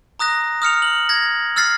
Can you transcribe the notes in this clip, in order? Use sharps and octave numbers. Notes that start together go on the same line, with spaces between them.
A#5 D#6 F#6 A#6
D#6 F6 C#7 F7
F#7
G#6 A#6
E6 F6 A6 C7